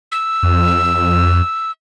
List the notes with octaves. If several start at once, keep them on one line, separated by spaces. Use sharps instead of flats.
E6
F2